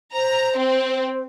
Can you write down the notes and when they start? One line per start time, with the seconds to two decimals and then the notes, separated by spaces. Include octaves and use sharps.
0.13 C5 A#5
0.57 C4